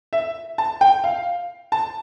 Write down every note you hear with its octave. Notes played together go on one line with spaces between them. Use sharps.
E5
A5
G5
F5
A5